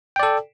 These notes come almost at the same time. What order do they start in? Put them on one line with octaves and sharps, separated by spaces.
G5 D5 A4